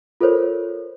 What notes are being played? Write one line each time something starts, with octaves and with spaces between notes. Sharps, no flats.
F4 A4 A#4 C5 C#5